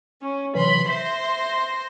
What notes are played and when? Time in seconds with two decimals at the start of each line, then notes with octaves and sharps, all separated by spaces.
0.20 C#4
0.55 C3 E3 F#3 B5 C6
0.89 C5 E5 C6 A#6